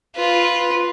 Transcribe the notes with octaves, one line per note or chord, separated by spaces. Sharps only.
F4 B4